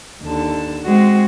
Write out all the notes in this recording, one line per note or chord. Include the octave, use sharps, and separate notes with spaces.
D#2 D3 A5
G#3 C4 F#4